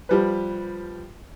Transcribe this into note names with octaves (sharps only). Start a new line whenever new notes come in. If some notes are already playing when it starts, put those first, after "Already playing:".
F3 G3 B4